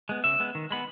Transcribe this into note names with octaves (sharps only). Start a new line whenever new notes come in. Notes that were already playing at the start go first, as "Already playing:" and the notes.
G#3 B3
C#3 E5
G#3 B3
D#3
G#3 B3 B5